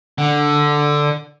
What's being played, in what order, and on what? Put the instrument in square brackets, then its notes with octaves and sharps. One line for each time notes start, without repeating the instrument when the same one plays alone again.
[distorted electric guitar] D3